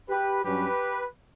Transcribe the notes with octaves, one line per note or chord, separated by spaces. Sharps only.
G4 B4
G2 F#3 C#4 G4 B4